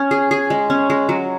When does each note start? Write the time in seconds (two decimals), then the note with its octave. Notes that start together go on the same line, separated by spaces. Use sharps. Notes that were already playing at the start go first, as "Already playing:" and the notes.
Already playing: C#4
0.11 G#4
0.31 G#4
0.50 G#3
0.70 C#4
0.90 G#3
1.09 F#3